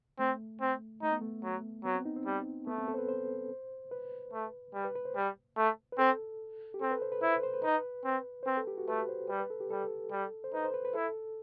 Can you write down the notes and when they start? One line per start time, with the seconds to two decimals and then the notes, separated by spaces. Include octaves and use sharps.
0.19 A3 C4
0.61 C4
1.02 A3 D#4
1.12 B3
1.21 A3
1.43 F#3
1.85 F#3 B3
1.95 C4
2.05 D#4
2.16 C4
2.26 G3
2.67 A3 B3
2.78 C4
2.88 A4
2.94 C5
2.98 B4
3.09 C5
3.91 B4
4.33 A3
4.74 G3
4.85 B4
4.95 B4
5.05 C5
5.16 G3
5.56 A3
5.92 B4
5.98 C4 A4
6.74 G4
6.81 C4 A4
6.91 B4
7.02 C5
7.12 B4
7.22 E4 C5
7.33 B4
7.43 C5
7.54 B4
7.64 D#4 B4
8.05 C4
8.43 C5
8.46 C4 B4
8.57 A4
8.67 G4
8.78 F#4
8.88 A3 B4
9.09 C5
9.29 G3 B4
9.40 B4
9.50 A4
9.60 G4
9.70 G3 A4
10.12 G3
10.44 C5
10.53 D#4 B4
10.64 C5
10.74 B4
10.85 B4
10.94 E4 A4